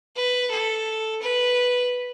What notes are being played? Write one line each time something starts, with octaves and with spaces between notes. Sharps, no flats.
B4
A4
B4